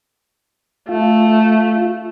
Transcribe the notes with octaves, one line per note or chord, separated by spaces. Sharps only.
A3 F4